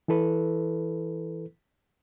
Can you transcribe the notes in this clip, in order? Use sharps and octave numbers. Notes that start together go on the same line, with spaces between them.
E3 E4 A4 B4